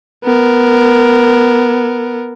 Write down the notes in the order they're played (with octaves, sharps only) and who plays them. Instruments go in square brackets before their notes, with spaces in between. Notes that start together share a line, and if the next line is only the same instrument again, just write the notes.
[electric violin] B3 A#4